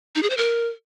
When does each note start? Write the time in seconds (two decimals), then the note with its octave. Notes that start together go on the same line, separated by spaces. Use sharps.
0.15 D#4
0.23 G#4
0.30 C5
0.37 A#4